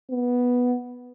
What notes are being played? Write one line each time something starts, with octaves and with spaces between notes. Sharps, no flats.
B3